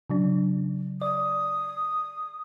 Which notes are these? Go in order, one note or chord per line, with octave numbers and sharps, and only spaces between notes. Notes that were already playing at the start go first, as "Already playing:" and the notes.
C#3 F#3 D4
D5 D#6